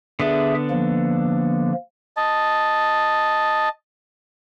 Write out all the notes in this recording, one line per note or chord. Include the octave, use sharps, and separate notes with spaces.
D3 B3 D4 G#4 E5
F3 A#3
D#5 A5